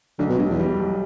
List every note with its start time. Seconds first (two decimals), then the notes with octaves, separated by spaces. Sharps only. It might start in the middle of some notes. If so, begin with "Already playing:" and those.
0.19 B1 D3
0.29 B2
0.38 B1 G2
0.49 E2
0.59 G3
0.80 B1